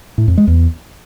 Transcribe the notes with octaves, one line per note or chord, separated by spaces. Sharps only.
A2
F2
G#3
E2